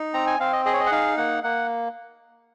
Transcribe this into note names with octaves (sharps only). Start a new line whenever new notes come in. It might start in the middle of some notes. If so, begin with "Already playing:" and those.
Already playing: D#4
C4 A#5
G#5
C4 F5
D#5
G#4 D#5
C#5
D#5
F#5
D#4 F5
A#3 F#5
A#3 F#5